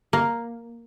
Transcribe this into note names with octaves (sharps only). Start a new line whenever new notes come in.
A#3